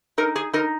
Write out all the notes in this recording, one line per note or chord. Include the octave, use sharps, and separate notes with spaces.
D#4 A#4
G#4
D#4 A#4